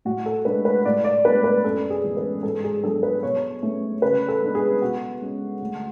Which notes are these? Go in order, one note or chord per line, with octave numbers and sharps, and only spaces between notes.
A2 F#4
A4
G#3 D4 B4
B4
A2 D5
D5
G#3 B3 D4 B4
B4
F#2 A4
G#4
E3 G#3 B3
B4
G#2 A4
G#4
F#3 B3 D4 A4
B4
B2 C#5
A3 C#4
C#3 B4
A4
G#3 B3 D4
G#4
B2 F#4
G#3 C#4
D2